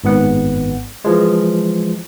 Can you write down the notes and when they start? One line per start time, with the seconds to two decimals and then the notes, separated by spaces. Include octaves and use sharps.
0.04 G#1 G#2 B3 F#5
1.05 E3 F3 G#3